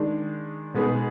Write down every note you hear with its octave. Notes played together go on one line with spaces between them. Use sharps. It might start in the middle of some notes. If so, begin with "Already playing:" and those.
Already playing: D#3 G#3 D4
B2 G#3 B3 D#4 G#4